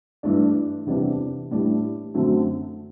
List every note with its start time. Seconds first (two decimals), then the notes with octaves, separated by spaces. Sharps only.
0.23 G2 E3 A3 D4
0.86 E2 C3 E3 G3 D4
1.51 A2 E3 G3 D4
2.14 F#2 D3 F#3 A3 C4